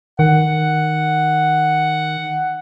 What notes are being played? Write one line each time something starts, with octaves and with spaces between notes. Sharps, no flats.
D#3 F#5